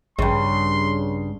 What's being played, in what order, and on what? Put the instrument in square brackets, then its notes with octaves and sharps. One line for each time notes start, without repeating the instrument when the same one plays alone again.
[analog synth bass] A#1 [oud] G2 C#3 [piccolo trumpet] C6